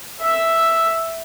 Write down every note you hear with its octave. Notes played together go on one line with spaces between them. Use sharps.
E5 E6